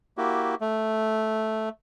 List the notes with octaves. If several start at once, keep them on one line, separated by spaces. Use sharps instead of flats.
A#3 E4 F#4 G4
A3